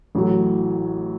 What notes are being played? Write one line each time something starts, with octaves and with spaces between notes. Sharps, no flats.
A1 A2 F#3